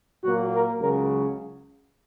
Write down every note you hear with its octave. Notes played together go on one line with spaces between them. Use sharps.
A#2 F#3 A#3 F#4
A#4
C#2 C#3 F#3 A#4